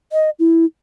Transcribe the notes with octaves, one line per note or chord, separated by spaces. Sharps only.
D#5
E4